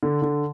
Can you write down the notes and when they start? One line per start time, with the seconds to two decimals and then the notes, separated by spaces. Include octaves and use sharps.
0.03 D3
0.22 D3